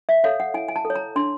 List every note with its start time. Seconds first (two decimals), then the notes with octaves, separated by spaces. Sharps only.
0.09 E5
0.24 A4 C#5 F5
0.40 F#5
0.54 E4 G#5
0.68 G#5
0.76 A5
0.85 A4
0.90 C#5
0.96 A#5
1.16 D4 C6